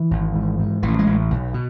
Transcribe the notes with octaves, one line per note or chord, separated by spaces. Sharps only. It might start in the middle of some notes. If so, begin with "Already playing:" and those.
Already playing: E3
G#1
G#2
G#2
A1 E3
G#3
A1
B1
B2